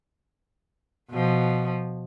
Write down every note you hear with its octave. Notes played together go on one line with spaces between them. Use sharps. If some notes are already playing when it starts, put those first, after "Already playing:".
B2 F3